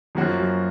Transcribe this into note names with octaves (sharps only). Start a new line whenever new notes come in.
F#2 D#3 F3 A#3 C#4 F#4
F#3